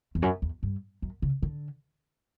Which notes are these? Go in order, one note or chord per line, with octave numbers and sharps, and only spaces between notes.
E2
F#2
E2
G2
F#2
C#3
D3